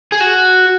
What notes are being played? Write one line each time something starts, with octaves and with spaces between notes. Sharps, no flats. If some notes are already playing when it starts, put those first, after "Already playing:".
G#4
F#4